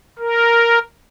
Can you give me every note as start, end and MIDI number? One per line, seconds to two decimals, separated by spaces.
0.19 0.79 70